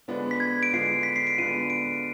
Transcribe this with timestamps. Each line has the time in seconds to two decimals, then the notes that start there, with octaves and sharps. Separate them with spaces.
0.08 D3 G#3 B3 D4 F4
0.31 B6
0.40 G#6
0.63 D7
0.73 D3 G#3 B3 D4 F4 C7
1.03 B6
1.16 C7
1.27 D7
1.38 D3 G#3 B3 D4 F4 D#7
1.70 D7